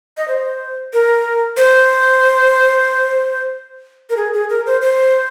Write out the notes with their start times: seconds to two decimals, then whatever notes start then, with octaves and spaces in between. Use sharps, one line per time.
0.17 D#5
0.28 C5
0.93 A#4
1.57 C5
4.10 A#4
4.17 G#4
4.33 G#4
4.50 A#4
4.66 C5
4.81 C5